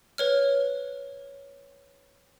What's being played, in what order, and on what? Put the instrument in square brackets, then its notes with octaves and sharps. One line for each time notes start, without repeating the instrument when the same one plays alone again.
[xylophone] B4 C#5 F6